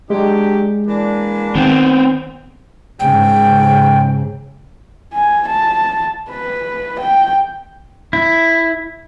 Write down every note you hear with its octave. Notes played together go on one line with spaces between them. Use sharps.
F#3 G#3 D4 G4
E3 A#3 D4
D#3 B3 C4
G#2 C#3 G5
G#5
A5
B4
G5
E4